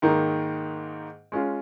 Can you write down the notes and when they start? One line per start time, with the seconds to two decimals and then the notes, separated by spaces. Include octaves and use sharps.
0.02 G#2 D#3 A#3 D#4
1.32 G#3 C#4 F4